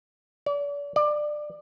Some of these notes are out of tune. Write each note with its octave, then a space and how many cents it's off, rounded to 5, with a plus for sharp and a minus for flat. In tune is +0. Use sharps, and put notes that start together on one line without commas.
D5 -40
D5 +20